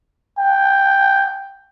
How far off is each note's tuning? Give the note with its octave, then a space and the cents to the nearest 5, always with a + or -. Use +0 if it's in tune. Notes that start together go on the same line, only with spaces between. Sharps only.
G5 +5